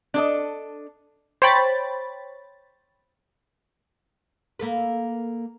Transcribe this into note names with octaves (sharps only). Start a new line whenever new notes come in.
D4 A4 D#5
C5 C#5 G5 B5 A6
A#3 A4 B4